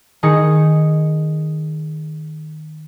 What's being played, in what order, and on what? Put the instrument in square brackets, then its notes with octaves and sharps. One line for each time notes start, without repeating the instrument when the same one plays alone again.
[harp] D#3 D#4 G#4 C#7